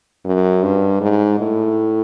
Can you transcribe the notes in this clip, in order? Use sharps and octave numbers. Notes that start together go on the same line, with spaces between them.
F#2
G2
G#2
A2